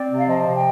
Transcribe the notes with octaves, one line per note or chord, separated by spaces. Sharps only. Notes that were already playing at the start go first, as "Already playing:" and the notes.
Already playing: C4 D5
C3
F5
F3 D#5
C3
G5